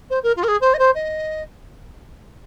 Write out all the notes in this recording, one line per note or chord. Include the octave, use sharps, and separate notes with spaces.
C5
A#4
F4
A#4
G#4
C5
D#5
C5
D#5